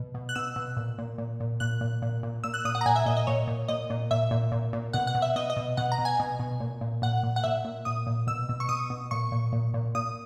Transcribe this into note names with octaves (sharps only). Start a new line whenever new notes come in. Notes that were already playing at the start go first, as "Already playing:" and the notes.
Already playing: B2
B2
F#6
B2 E6
B2
A#2
A#2
A#2
A#2
A#2 F#6
A#2
A#2
A#2
A#2 E6
F#6
A#2 D#6
F#5
A#5
A#2 G#5
E5
A#2 D#5
D#5
A#2 C#5
A#2
A#2 D#5
A#2
A#2 E5
A#2
A#2
A#2
B2 F#5
F#5
B2
E5
B2 D#5
D#5
B2
B2 F#5
A#5
B2
G#5
B2
B2
A#2
A#2
A#2 F#5
A#2
F#5
A#2 E5
A#2
A#2 D#6
A#2
B2 E6
B2
C#6
B2 D#6
B2
A#2 C#6
A#2
A#2
A#2
A#2 D#6